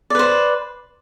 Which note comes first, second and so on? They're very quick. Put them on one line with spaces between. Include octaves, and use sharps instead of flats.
D5 B4 C5